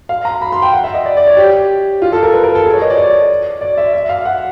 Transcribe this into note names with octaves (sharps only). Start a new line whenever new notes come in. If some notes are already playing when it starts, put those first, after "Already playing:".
F5
A#5
B5
C6
G5
F#5
E5
D#5
D5
D5
C#5
G4
F4
A4
A#4
B4
A#4
A4
G#4
C#5
D#5
D5
C#5
D5
E5
E5
F5
F#5